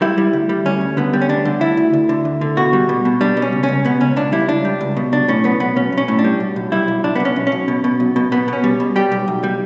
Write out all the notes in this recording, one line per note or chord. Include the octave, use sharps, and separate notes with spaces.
G3 E4
G3
D2
G3
D2 C#4
D2
D3 B3
G3
C#4
D2 D4
D3
D2 E4
D2
D2
D3
D2
D3
B2 F#4
G3
B2
B2
G3 D4
B2
C#4
C#2
C#4
C#2
B2 B3
C#2 C#4
C#2 D4
G3 E4
C#2 D4
G3
C#2
B2
B1 D4
A2 C#4
B1 B3
B1 B3
B1 C#4
B1
C#4
A2
D4
G3
B1
B1
G3 E4
B1
B1 D4
B3
B1
C#4
B1
C#4
B1
B2
B2
B1
B2
B2 B3
B2 C#4
G3
B2
G3 G4
B1
B1
G3